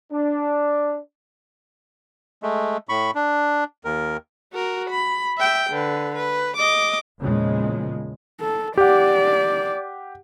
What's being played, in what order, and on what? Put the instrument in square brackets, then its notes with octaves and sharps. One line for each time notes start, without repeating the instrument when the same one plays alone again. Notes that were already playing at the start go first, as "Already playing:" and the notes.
[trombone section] D4
[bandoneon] G#3 A3
A2 B5 C#6
D4
D#2 A#4
[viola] F#4 A#4
B5
E5 G5
D3 B4
B4
D#5 D6
[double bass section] A#1 E2 A#2 C#3 F3 G#3
[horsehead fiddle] A4
[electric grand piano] G4 F#5 [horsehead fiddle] D5